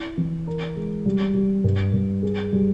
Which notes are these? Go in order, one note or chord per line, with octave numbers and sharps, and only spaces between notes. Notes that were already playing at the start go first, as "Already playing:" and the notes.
Already playing: E4
E3
A#4
G#3
G3
G3
G2
G2
G#4
G3